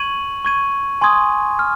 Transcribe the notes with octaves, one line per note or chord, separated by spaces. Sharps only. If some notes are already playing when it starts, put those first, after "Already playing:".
Already playing: C#6 G#6 D#7 F#7
C#6 G#6 D#7
G#5 C6 D#6 G#6
F6